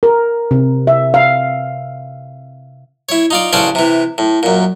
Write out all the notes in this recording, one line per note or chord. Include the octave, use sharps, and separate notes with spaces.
A#4
C3
E5
F5
E4 C#5
D#4 F4 D5
A1 C#3 C#4 D4 C5 D5
C3 E3
A2
F#2 A#2